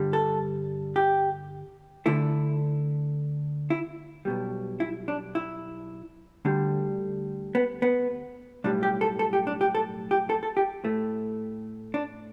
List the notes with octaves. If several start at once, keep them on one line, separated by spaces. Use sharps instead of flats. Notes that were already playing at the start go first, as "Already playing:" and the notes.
Already playing: G2 D3 G3
A4
G4
D2 D3 A3 E4
E4
B1 B2 G3
E4
D4
E4
D2 D3 G3
B3
B3
B1 A2 G3 D4
G4
A4
A4
G4
D4
G4
A4
G4
A4
A4
G4
A2 A3
D4